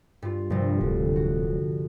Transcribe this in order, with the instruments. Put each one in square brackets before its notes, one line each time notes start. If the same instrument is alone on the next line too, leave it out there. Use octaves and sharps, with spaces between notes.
[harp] G2 F4
[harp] A#1 C3 [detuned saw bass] G2
[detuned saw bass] D1 [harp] D3
[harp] F#4